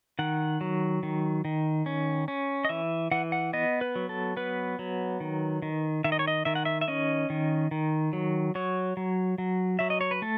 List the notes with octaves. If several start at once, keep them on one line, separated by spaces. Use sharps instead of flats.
D#3 F#5
F#3
D#3
D#3
C#4
C#4
D#5
E3 E5
E3 F#5
F#5
B3 D#5
B4
F#3
A4
B3 B4
F#3
D#3
D#3
D#3 E5
D#5
C#5
D#5
D#3 E5
F#5
E5
E5
C#4 D#5
D#3
D#3
F#3
F#3 C#5
F#3
F#3
F#3 E5
D#5
C#5
B4
A3 A4